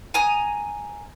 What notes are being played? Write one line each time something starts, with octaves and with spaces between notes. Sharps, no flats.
G#5 A#5 D#6